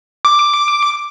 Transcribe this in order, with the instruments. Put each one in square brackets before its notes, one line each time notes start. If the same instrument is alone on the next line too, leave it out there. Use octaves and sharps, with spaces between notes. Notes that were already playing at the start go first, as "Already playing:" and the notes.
[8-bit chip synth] D6